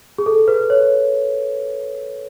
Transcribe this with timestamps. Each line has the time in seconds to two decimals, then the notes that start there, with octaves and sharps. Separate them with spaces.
0.18 G#4
0.26 A4
0.48 B4
0.70 C#5